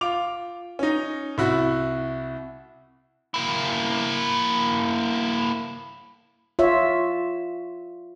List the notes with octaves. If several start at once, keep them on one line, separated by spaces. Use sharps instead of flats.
F4 D6 F7
C#4 D#4
C2 E4 F#4
A#3 E4
F4 C#5 E5